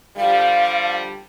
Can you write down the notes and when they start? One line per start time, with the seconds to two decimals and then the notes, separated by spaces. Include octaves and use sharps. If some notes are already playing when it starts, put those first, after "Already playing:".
0.17 D3 F3 G3 F5